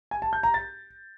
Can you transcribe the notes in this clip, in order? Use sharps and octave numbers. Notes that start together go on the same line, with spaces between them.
G#5
A5
G6
A#5
A6